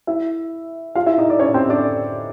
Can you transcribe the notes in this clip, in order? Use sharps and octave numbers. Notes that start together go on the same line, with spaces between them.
E4 E5
F4 F5
E4 E5
D#4 D#5
D5
C#4 C#5
C4 C5
D4 D5